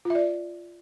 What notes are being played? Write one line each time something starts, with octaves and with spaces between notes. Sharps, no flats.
F4 D5 E5